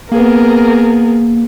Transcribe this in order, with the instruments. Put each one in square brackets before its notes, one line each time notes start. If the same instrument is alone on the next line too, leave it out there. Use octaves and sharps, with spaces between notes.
[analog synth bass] A#3 [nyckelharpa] B3 G#4 [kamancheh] A#4